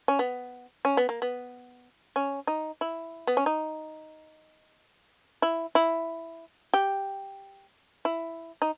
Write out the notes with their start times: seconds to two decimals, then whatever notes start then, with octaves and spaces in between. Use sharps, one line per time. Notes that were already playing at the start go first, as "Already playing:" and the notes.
0.08 C#4
0.19 B3
0.85 C#4
0.97 B3
1.09 A#3
1.22 B3
2.16 C#4
2.47 D#4
2.81 E4
3.27 B3
3.37 C#4
3.46 D#4
5.42 E4
5.75 E4
6.74 G4
8.05 E4
8.62 D#4